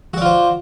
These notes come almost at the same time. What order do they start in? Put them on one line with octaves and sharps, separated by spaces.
F#4 D5 F4 C5